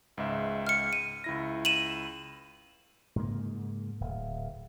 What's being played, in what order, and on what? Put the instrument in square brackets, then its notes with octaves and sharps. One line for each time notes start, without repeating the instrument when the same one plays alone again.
[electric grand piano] C#2 G#2 E5
[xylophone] F6 C#7
D#7
[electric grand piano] C#2 E4 A#6
[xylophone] D#7 E7 F#7
[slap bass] G#2 C#3 A#3
D1